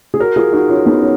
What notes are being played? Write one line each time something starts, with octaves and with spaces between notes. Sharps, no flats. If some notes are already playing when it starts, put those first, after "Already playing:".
G#4
F#4 A#4
F4 G#4
D#4 F#4
C#4 F4
B3 D#4
C#4